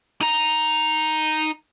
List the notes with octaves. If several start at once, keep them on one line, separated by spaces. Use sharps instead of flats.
D#4 A#5